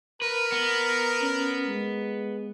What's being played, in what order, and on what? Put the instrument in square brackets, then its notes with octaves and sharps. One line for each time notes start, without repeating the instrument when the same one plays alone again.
[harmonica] A#4 [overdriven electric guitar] B4
[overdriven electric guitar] B3
[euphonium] C#4
G#3